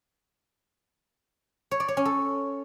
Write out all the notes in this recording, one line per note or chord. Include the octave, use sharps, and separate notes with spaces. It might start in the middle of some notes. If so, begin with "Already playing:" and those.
C#5
D5
C#5
C#4
A4